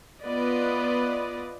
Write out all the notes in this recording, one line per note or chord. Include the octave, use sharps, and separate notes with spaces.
B3 F4 B4 D5 D#5